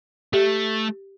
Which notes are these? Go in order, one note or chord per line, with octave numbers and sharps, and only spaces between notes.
A3 G4